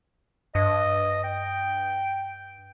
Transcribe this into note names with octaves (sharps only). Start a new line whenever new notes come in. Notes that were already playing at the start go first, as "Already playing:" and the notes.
G2 D#5
G5